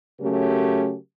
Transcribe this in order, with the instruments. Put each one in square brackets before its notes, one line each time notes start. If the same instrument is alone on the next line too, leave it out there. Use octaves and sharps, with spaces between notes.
[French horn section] C#3 F#3 A3 C#4 G4 A#4